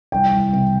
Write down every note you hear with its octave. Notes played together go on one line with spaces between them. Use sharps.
C2 G5
C2
C3